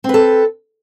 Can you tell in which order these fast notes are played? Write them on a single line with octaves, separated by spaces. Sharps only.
C4 B4 A4